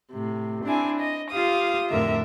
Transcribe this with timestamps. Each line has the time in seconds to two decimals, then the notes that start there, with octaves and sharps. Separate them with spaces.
0.12 A2 C3
0.65 C4 D4 E4 G#5
1.00 D#5
1.31 F4 G4 F5 D#6
1.89 F2 A2 D3 A#4 E5